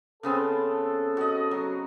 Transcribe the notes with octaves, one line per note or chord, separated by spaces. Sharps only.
C#3 B3 C4 A4
F#4 D#5
F#3